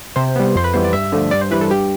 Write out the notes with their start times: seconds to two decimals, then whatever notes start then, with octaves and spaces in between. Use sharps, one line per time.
0.16 C3 C5
0.36 G3 B3
0.55 F2 C5
0.64 B4
0.73 E3 G3 B3 C5
0.84 D5
0.93 G2 E5
1.12 D3 F3 A3
1.31 G2 D5
1.41 C5
1.51 E3 G3 B4
1.61 A4
1.71 G2 G4